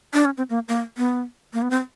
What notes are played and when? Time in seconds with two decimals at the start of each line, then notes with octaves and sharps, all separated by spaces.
0.13 D4
0.25 C#4
0.38 C4
0.50 A#3
0.68 A#3
0.98 B3
1.54 A#3
1.62 B3
1.71 C4